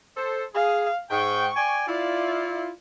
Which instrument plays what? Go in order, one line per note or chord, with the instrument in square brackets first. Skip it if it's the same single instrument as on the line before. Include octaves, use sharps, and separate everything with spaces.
[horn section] A4 C5
[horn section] G#4 [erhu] F5
[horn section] G#2 G5 [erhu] C#6
[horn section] D5 G5 G#5
[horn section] E4 F4 [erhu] D5